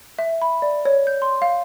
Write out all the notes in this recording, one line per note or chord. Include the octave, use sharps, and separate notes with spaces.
E5
B5
D5
C#5
G6
C6
F5